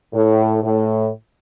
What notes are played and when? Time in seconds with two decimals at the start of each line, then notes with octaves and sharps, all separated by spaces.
0.13 A2
0.63 A2